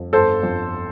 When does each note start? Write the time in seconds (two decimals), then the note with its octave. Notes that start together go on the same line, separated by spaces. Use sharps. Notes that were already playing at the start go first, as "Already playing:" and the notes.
Already playing: F2
0.13 G1 A4 C5
0.43 F2